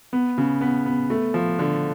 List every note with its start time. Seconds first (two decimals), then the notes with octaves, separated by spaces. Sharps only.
0.13 B3
0.38 C#3
0.61 B3
0.86 B3
1.10 A3
1.34 F3
1.59 D3